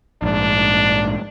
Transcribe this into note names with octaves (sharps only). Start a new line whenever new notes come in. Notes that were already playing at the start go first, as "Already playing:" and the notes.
A#1 G#2 D4